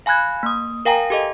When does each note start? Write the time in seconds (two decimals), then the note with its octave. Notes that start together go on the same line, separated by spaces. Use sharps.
0.06 F5 G#5 B5 F#6 G#6
0.43 A#3 D#6
0.85 A#4 F5 G5 G#5 A#5
1.10 G4 A4 D#5